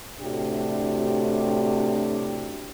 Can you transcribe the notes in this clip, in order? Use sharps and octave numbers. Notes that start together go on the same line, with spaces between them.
A2 C3 D4 F#4 G4